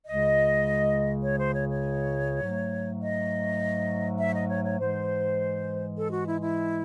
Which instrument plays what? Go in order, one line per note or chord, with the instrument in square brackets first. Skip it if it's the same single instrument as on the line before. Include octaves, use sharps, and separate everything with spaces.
[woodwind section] C#2 C#3 G#3 D#5
C#5
C5
C#5
C#5
G#2 F#3 A3
D#5
E5
D#5
C#5
C#5
G#2 E3 G#3 C5
A4
F#4
E4
E4